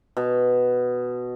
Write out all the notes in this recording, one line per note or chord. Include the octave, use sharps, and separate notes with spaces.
B2